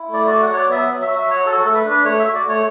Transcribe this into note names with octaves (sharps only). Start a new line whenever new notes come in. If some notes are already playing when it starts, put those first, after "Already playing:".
Already playing: E4
A3
D5
F#4 D5
F#3 F#5
C#5
D5
B3 E5
F#3
E5
F#4
E5
F#3 C#5
F#4 A4
A4
A3
B4
D4
B4
A3 C#5
E5
F#4
D5
A3 C#5